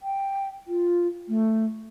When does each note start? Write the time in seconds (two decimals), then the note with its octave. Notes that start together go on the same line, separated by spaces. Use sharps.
0.02 G5
0.67 F4
1.28 A3